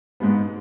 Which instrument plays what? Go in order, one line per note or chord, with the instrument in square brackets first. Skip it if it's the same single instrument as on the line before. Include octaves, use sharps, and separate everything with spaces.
[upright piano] G#2 G#3 B3